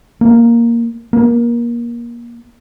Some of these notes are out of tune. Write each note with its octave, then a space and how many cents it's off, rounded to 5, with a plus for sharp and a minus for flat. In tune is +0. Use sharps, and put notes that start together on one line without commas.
A#3 +0
A#3 +25